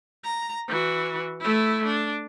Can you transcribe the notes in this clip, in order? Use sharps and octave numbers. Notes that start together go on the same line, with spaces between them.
A#5
E3 F#4
A3 E4
D4